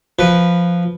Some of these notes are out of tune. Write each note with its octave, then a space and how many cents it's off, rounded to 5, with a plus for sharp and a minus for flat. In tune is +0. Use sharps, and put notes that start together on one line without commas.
F3 +0 B4 +0